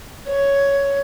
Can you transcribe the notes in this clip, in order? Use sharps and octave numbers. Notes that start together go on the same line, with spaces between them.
C#5